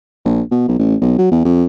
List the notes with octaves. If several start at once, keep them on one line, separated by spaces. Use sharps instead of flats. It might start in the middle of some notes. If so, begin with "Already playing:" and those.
A#1
B2
B1
A1
B1
F#3
E2
F2